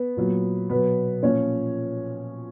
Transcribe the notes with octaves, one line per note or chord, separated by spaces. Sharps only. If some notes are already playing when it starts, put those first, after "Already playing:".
Already playing: B3 B4
A#2 F#3
B2 F#3 B3 B4
A#2 F3 C#4 C#5